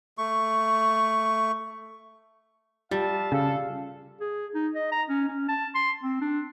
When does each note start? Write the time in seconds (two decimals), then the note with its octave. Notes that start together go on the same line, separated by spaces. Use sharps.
0.18 A3 C#6
2.91 G3 F4 G4 E5 F5 A5
3.32 C#3 D4 A4 F5
4.20 G#4
4.54 D#4
4.75 D#5
4.92 A#5
5.09 C#4
5.28 C#4
5.48 A5
5.75 C6
6.03 C4
6.21 D4